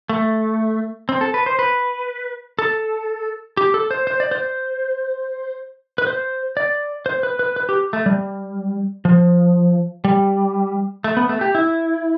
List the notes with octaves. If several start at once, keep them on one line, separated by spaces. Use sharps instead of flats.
A3
C4
A4
B4
C5
B4
A4
G4
A4
C5
C5
D5
C5
B4
C5
D5
C5
B4
B4
B4
G4
A3
G3
F3
G3
A3
B3
A3
G4
E4